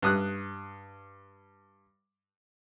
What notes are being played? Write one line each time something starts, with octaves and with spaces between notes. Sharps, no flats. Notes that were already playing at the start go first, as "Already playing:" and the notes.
G2 D#6 F#6